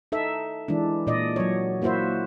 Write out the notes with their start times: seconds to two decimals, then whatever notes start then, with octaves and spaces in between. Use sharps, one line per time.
0.12 D#4 A4 E5
0.68 E3 G#3 D4
1.07 A#2 D5 D#5
1.36 F#3 C#5
1.82 A#3 E4 F#4 C5 E5